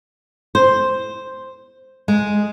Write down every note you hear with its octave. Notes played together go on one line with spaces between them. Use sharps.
C5
G#3